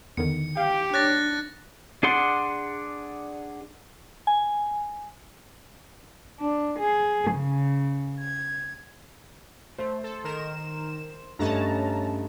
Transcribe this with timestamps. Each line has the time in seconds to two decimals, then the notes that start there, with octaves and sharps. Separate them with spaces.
0.17 E2 D3 D#3 C#7
0.57 G4 F5 G5
0.94 D4 C#5 F#6 A6 A#6
2.03 D4 G#4 D5 F#5 C6
4.27 G#5
6.39 D4
6.79 G#4
7.32 C#3
8.20 G#6
9.78 A3 C5
10.04 A4
10.24 D#3 A#4 E7
11.39 G2 A3 C#4 D#5 A5 A#5